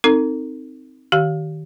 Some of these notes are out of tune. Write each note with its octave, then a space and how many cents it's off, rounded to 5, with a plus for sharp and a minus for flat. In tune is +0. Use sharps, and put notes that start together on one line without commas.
C4 +0 D#4 +0 A4 +45
D#3 +0 G4 -30 F5 +0